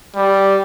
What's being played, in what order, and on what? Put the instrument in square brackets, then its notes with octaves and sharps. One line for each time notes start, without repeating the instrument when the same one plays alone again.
[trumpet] G3